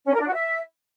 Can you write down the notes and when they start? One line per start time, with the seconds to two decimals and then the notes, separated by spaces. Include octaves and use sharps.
0.06 C#4
0.13 A#4
0.20 D4
0.26 F#4
0.33 E5